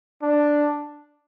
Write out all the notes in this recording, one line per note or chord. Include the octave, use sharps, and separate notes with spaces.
D4